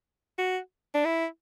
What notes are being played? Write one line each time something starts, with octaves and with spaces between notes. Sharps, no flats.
F#4
D4
E4